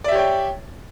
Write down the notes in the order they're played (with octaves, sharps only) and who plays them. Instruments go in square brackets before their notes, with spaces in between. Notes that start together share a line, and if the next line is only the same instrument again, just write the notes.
[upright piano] D5
E5
G4
C#5
G5